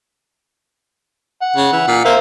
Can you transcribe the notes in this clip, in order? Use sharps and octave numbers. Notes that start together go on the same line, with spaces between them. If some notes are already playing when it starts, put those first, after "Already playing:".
F#5
C#3
E3
A#2
A#3 C5 E5 F5